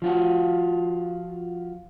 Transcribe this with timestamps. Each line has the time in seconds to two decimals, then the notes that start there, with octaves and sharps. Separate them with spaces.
0.02 F3 F4 F#4